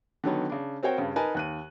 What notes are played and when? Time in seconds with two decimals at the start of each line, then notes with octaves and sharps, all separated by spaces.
0.24 D3 D#3 F#3 B3
0.49 C#3 D4
0.83 C4 F#4 A#4 C5 C#5 G5
0.98 G2 C#3
1.16 D#4 A#4 B4 G#5 A5
1.35 D#2 F#6 D#7